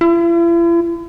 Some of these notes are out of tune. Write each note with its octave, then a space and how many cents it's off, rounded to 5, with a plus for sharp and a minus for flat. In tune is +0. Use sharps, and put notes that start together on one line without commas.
E4 +45